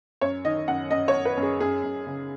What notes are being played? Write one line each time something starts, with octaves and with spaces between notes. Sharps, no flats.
F#2 C#5
D#3 D#5
F#2 F#5
F#2 D#5
C#5
F#2
B4
F#2
G#4
F#2 G#4
F#2
C#3